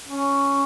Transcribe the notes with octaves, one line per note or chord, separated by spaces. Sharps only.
C#4